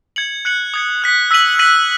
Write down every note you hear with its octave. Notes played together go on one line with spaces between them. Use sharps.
G#6 C#7 F#7
F#6 C#7 F#7
D#6 G#6 C#7
D#6 F#6 B6
E6 B6 D#7 F#7
F#6 B6 D#7 F#7